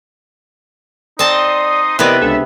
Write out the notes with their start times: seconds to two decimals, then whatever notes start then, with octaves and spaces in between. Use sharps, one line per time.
1.19 C4 D#4 D5 A5 C6 D#6
1.99 C3 B3 E4 A#4 B4 D5 D#5
2.21 C#2 D4 A4 E5